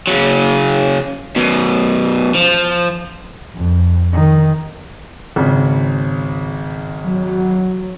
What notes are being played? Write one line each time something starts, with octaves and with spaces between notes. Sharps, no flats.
C#3 F#3
F#2 B2
F3
F2
D#3
G#1 C#3
F#3